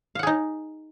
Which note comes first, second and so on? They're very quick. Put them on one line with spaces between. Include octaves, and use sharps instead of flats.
F5 F#5 G#4 D#4